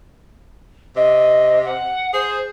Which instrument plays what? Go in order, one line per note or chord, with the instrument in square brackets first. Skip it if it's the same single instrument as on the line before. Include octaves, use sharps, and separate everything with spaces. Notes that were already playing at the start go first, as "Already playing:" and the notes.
[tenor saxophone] C3 [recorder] D#5
[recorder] F#5
[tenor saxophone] G#4 [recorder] C5